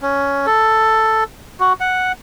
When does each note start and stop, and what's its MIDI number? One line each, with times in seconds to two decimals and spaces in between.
0.02 0.46 61
0.46 1.24 69
1.60 1.73 66
1.80 2.12 78